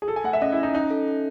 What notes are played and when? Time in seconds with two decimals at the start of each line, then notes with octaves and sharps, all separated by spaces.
0.02 G#4
0.08 F#4 A4
0.16 G#5
0.24 A3 F#5
0.33 E5
0.42 C#4 D#5
0.52 E4
0.57 C#4
0.63 D#4
0.74 C#4 D#4
0.91 A4
1.08 C#4